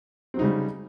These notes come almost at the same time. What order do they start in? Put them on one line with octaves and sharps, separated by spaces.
C4 F#3 D#4 C#3 G3